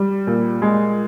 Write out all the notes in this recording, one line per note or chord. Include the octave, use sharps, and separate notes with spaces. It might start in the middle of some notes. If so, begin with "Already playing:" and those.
Already playing: G3
A#2
G#3